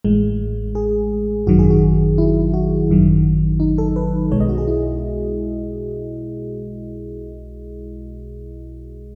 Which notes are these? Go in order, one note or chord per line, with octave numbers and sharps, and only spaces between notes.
A1 A2 G#3
G#4
G#1 F#2 D#3 F#3 F#4
G#4
F#4
E4
F#4
G#1 F#2 D#3 F#3
D#4
A4
B4
B1 B2 G#3 C#5
D#5
F#4
G#4
E4